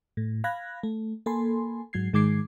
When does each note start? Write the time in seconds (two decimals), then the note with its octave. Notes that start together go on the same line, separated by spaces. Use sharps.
0.17 A2
0.44 F5 B5 F#6 G#6 A#6
0.83 A3
1.26 A#3 A4 G#5 B5 C6
1.93 G#2 F#3 G#6 C7
2.13 G#2 D#3 G#3 D6 G#6 C7